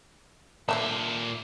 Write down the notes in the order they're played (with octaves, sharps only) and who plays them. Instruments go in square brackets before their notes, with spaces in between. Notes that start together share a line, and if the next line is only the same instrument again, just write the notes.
[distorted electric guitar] A#2 E5 [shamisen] D3 A3 D4